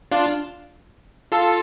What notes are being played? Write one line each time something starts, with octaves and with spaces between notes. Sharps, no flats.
D4 F4
F4 A4